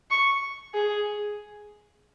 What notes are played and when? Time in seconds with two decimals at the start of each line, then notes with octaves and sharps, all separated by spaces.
0.11 C#6
0.74 G#4